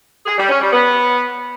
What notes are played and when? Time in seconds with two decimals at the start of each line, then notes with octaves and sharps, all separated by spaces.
0.26 G#4
0.37 G3
0.49 C#4
0.60 G3
0.72 B3